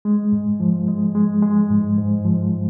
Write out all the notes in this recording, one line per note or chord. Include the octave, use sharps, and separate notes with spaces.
G#3
G#2
F3
G#3
G#3
G#3
G#2
G#2
F3